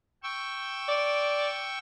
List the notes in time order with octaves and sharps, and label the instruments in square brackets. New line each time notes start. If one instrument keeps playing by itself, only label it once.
[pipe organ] G5 C#6 E6
[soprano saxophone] D5